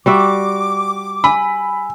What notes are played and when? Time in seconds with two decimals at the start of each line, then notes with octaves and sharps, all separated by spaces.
0.06 G3 F#4 E5 D6
1.24 G#5 B5 E6